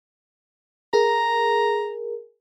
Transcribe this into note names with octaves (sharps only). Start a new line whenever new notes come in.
G#4 A#4 A#5